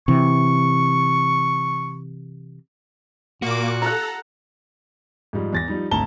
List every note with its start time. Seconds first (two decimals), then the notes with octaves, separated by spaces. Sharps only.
0.08 C3 E3 C#6
3.42 A#2 A#3 F#4 D6
3.82 A4 F#5 A#5
5.33 G#2 F3 G3 G#3
5.53 E2 A6 A#6
5.68 F3 G3 D#4
5.91 G#1 D2 A5 A#5 G7